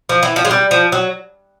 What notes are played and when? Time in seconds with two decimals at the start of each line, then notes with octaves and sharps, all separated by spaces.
0.09 F3
0.23 E3
0.36 F3
0.45 G#3
0.51 G3
0.71 F3
0.92 F#3